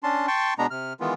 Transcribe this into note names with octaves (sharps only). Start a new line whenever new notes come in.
C#4 D4 A5 C6
G5 A5 C6 C#6
B2 G#3 B3 D4 A#5
C3 F6
D#3 E3 G#3 B3 F4